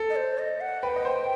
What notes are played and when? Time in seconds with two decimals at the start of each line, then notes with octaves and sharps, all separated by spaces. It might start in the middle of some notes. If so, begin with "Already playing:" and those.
Already playing: A4
0.10 D#5
0.16 C5
0.38 D#5
0.61 F#5
0.83 B4 G5
0.96 D#5
1.05 C5